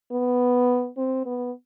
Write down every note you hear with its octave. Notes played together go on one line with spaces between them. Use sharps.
B3
C4
B3